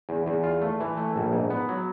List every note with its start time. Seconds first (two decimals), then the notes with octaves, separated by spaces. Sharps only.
0.09 E2
0.26 E2
0.44 F4
0.61 A3
0.80 E3
0.97 A3
1.16 A#1
1.33 G#2
1.50 B3
1.69 F#3